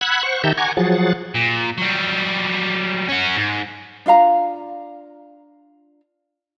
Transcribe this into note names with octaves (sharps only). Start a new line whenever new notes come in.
F#5 B5 E6 F#6 G#6
C5 F#5 C#6
D#3 G4 E5 A5 A#5 G6
F#5 G#5 A#5 C#6 D6 G#6
F3 F#3 G#4 F#5 A6
A#2
F#3 G3
C#4 F#4
G#2
D4 F4 F5 A#5